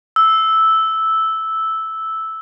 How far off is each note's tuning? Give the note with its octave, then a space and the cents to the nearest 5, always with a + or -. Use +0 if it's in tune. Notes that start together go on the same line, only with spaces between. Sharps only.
E6 -5